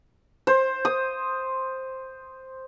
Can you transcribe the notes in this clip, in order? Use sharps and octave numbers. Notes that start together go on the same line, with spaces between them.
C5
D#6